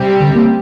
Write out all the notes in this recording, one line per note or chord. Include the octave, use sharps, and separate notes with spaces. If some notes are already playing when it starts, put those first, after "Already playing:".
Already playing: C3 G3 C4 G4
D3
A#3